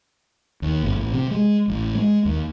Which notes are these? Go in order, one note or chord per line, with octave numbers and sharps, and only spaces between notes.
D#2
G1
A1
C3
G#3
A1
G#3
D#2